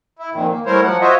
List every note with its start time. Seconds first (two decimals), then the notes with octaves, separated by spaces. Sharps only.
0.19 E4
0.33 F2 A#2 D#3
0.50 A#3
0.66 G3 A3 E4 A#4 C5 C#5
0.83 F3 F#3 F#5
1.01 F4 F#4 C5 C#5 D#5 E5